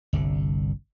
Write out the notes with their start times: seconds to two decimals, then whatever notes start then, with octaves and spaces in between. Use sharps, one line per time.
0.13 G1 C2 D3